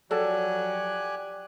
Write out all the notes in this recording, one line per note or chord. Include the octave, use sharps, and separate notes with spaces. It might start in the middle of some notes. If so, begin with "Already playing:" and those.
F3 F#3 G4 A4 D5 G#5 A5 F#6